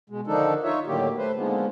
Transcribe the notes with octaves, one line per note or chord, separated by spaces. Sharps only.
B2 G#3
D3 D#3 F3 D4 D#4 A4
D#4 F4 C#5 E5
A2 D3 D#3 F#3 A#3 G4
A3 B4 C5
D3 D#3 F3 G#3 A#3 B3